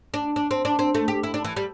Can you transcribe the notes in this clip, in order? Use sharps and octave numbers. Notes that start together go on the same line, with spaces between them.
D4
D4
C4
D4
C4
A3
G4
E4
D4
E3
G3